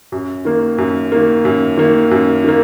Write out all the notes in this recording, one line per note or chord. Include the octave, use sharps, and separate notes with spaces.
F#2
D#3 A#3
F#2
D#3 A#3
F#2
D#3 A#3
F#2
D#3 A#3